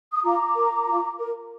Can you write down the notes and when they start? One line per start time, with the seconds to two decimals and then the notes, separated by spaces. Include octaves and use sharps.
0.13 D#6
0.23 F4 A#5 D6
0.55 A#4
0.86 F4
1.18 A#4